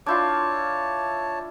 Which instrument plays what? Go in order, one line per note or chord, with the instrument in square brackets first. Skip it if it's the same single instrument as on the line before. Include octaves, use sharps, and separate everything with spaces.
[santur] D4 E4 F4 [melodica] C#5 A5 [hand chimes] D6 G6